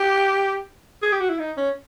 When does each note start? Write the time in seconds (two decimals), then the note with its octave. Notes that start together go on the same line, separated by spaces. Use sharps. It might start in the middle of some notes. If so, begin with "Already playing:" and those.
Already playing: G4
1.03 G#4
1.12 G4
1.20 F#4
1.30 E4
1.39 D#4
1.57 C#4